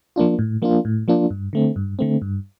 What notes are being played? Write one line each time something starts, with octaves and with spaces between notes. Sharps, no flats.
F3 A#3 D4 F4
A2
F3 A#3 D4 F4
A2
F3 A#3 D4 F4
G2
D3 A3 C4
G2
D3 A3 C4
G2